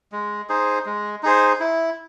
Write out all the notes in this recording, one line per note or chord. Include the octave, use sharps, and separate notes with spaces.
G#3
D#4 G#4 C5
G#3
D#4 G#4 C5
E4